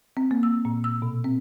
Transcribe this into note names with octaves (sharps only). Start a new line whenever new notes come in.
C4
A#3
E6
A#2
E6
B2
C4